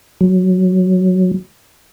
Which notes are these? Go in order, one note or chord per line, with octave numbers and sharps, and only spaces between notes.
F#3